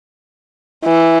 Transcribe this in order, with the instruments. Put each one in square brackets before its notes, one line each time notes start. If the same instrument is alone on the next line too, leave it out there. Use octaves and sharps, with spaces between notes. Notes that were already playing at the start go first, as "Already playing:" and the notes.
[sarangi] E3